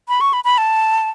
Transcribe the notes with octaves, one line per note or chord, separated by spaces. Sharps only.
B5
C#6
B5
B5
A5